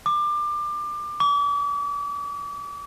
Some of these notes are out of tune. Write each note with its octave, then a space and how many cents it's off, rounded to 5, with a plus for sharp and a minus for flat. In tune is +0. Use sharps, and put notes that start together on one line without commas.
D6 +25
D6 -40